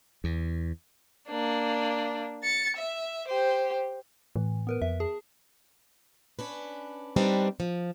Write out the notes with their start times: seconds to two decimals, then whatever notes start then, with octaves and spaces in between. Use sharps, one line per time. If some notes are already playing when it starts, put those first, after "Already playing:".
0.24 E2
1.29 A#3 D4
2.44 A6 C#7
2.76 E5
3.28 G4 C5
4.36 A2 E3
4.67 B3 A#4 B4
4.82 F2 E5
5.00 G#4 A5
6.39 C#4 D4 B4
7.16 G3 C4 D4 D#4 B4
7.60 F3